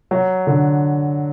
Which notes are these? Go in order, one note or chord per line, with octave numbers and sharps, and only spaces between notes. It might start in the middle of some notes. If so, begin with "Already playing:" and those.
F#3
D3